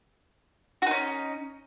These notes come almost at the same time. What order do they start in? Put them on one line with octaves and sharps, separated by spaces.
F#4 D#4 C#4